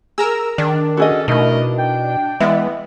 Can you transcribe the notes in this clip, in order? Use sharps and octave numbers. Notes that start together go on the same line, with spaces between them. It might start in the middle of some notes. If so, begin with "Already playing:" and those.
G#4 A#4 A#5 E6
D#3 D4
C#4 F#4 G#4 A4 D#5
B2 A3 D#4 E4 A#4 D#5
G5
E3 G#3 B3 D5 E5